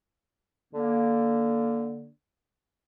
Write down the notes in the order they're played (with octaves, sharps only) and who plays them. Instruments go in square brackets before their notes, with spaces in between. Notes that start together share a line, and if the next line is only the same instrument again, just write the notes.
[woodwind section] D3 A#3